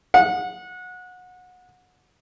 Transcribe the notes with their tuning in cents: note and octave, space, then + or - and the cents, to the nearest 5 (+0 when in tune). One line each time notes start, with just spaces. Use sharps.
F#5 -25